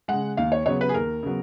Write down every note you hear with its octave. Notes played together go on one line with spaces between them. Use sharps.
C#3 G#3 F#5
D#2 F5
C#5
C#3 F#3 B3 C#5
B4
G#4
D#2 A#4
C#3 F#3 B3